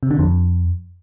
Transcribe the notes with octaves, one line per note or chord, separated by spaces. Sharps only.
C3
D3
F2